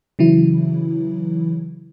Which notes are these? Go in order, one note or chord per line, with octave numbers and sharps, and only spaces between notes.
C#3 E3 F#3 E4